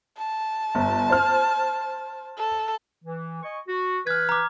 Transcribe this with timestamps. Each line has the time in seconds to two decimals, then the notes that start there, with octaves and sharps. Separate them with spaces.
0.17 A5
0.75 G1
1.09 C5 F6
2.38 A4
3.05 E3
3.43 D#5 G#5 C#6
3.68 F#4
4.07 E3 B4 F6 G#6
4.29 A#5 D6